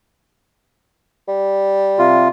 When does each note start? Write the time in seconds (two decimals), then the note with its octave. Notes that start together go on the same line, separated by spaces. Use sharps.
1.28 G3
1.99 C3 F4